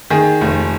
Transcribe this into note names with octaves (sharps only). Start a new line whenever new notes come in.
D#3 G#4
F1